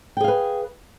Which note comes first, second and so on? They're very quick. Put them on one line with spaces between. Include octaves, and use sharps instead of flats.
G5 G#4 F5 B4